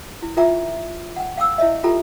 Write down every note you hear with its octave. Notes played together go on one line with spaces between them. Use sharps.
E4
F4 A#4 E5 G5 A#5 D6
F#5 G5
F5 G5 D6 E6
E4 C#5 D#5 E5
F4 G4 A4 G5 A#5